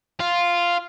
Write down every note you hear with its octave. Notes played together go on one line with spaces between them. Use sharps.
F4